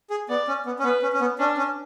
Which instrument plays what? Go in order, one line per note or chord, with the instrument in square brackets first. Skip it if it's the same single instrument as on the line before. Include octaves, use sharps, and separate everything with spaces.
[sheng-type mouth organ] G#4
[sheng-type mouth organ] B3 [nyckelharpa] D5
[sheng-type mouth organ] C#4
B3
C#4
[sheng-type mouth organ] B3 [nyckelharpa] B4
[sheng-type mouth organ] C#4
C#4
B3
[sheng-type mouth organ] C#4 [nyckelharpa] D4
[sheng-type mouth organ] C#4